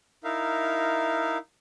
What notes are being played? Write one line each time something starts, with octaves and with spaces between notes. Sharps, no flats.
D#4 E4 A#4 E5 F5